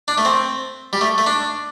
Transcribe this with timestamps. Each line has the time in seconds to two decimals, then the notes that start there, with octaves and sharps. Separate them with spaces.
0.08 D4
0.18 A3
0.25 C4
0.93 G3
1.01 A3
1.18 A3
1.26 D4